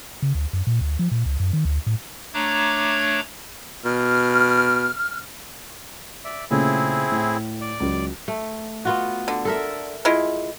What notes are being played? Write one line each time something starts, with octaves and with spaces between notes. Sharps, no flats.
C#3
D2
F#2
A#2
D2
F3
A#2
C#2
F#2
D#3
D2
A2
A3 D4 C#5 A#5 D6 G#6
B2 F6
D5 E5
A#2 C#3 A3 C4 E4 G#4
A2
D5
C#2 F#3
A3
B3 F4 F#4
D3
A4 A#4 E5
G#3 E4 F4